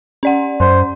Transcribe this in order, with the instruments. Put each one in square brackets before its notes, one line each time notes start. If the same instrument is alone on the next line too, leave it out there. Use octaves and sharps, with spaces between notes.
[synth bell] C#4 D5 F#5
[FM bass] F#2 [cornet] C5